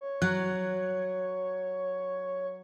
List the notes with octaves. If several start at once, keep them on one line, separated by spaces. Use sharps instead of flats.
C#5
F#3 F#6